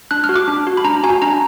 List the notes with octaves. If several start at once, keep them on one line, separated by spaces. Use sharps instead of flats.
D4 F#6
F6
F#4
D6
D4
F#4
B5
D4 A#5
F#4 G#5
D4 A#5